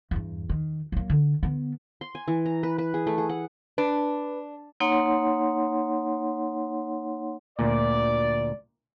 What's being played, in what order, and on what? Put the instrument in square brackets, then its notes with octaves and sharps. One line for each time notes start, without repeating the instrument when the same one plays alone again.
[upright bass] E2 G2
D#3
F#3 A#3
D3
D3 B3
[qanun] C6
G#5
E3
A#5
B4
B4
G#4
A3
G#4
F#5
[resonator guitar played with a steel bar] D4 [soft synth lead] B4
[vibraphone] A#3 D#4 C#5 F#5 C6
[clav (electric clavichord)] D2 A#2 [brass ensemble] D5